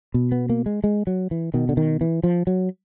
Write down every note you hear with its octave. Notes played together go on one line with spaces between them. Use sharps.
B2
B3
A#3
G#3
G#3
F#3
E3
B2 D#3
D3
D#3
E3
F3
F#3